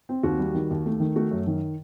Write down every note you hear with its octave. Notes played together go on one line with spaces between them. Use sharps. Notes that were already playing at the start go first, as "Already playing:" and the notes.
C4
D#2 F#4
G3
D#3
D#2
A3
D#3
A3 F#4
F#2
D#3